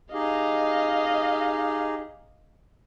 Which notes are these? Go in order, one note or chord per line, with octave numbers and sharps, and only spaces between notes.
D#4 G4 G#4 D#5 F5